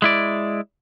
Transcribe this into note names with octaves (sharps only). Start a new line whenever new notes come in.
G#3 E4 D5